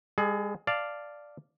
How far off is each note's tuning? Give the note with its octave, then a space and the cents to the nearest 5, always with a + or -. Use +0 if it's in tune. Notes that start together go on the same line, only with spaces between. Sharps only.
G#3 -40 G#4 +30
D5 +0 F5 -5 A5 +0